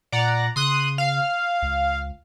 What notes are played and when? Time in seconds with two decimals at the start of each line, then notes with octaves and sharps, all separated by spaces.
0.12 A#2 D5 F#5 A#5
0.56 C#3 C6 D#6 F#6
0.98 F5
1.62 C#2